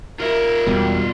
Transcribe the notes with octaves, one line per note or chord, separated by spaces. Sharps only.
F4 A#4 E5
E2 B2 G3